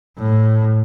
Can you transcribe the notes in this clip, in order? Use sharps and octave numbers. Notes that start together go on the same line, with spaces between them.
A2